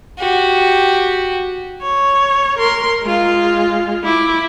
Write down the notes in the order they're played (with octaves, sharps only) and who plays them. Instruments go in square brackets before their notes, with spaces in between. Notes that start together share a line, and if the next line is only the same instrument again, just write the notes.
[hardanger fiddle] F#4 G4
[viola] C#5
A#4 C6
G#3 F4
E4 D6